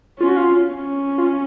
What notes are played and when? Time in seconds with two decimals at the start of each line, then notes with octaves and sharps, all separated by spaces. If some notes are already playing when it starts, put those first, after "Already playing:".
0.19 C#4 F4
0.28 F#4
0.37 F4
0.69 C#4
1.18 F4